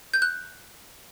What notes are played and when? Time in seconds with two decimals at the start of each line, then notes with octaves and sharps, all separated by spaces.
0.14 G6
0.22 F#6